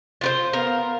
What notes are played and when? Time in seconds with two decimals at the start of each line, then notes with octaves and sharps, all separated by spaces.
0.21 F4 B4 C5
0.53 B3 A#4 F5